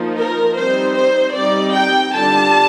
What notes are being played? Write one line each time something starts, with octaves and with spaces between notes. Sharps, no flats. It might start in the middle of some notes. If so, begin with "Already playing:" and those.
Already playing: F3 A#3 D#4
A#4
G3 C4 D#4 C5
C5
G3 C4 D#4 D5
G5
D3 G3 D4 F4 A5